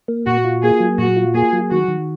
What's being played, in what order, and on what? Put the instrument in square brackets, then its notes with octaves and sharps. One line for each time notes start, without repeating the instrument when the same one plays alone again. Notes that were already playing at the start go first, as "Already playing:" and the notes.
[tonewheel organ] A#3
[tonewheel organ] A#2 [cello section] F#4
[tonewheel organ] F4
[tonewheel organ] A#3 [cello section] G#4
[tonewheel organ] F#3
[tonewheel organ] A#2 [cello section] F#4
[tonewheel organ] F4
[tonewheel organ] A#3 [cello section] G#4
[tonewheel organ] F#3
[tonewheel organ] D#3 [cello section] F#4
[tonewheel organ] D#3